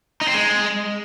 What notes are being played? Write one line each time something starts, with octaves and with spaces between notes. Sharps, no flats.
D#4
C4
G#3